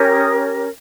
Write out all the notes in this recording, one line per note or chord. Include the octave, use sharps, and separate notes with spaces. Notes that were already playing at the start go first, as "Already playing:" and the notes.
Already playing: C#4 G4 A#4 C#5
D#6